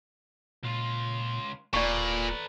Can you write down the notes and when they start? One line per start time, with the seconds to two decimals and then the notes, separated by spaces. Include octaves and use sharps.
0.63 C#2 A#2 F4
1.74 D#1 A#2 A4 B4 D5 C#6